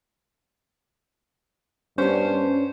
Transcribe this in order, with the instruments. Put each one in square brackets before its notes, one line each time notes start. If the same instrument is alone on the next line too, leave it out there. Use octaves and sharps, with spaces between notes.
[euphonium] G2 [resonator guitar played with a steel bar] B3 D4 [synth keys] C#4 [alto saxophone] C5